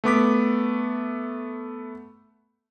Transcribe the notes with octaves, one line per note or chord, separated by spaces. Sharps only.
A3 B3 D6 B6